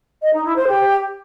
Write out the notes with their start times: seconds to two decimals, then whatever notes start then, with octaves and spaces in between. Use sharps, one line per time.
0.22 D#5
0.33 D#4
0.44 E4
0.56 C5
0.67 G4